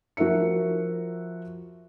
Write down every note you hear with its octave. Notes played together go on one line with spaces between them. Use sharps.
F3 F#4 A#4 E5 C#7